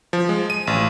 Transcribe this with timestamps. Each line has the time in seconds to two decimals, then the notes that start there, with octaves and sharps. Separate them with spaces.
0.13 F3
0.29 G#3
0.50 D#7
0.67 A1